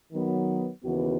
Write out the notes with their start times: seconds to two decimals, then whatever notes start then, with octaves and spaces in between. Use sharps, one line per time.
0.12 D#3 F#3 B3
0.83 D#2 C#3 E3 B3 F#4